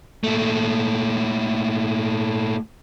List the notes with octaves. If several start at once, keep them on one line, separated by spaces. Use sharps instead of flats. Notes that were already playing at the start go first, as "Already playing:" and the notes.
A#2 A3